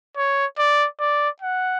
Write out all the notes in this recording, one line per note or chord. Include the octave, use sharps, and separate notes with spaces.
C#5
D5
D5
F#5